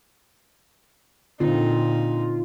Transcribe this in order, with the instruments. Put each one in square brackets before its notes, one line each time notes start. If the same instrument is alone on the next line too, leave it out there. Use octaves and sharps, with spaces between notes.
[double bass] A#2 [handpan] D3 C4 [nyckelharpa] D#4 [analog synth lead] F4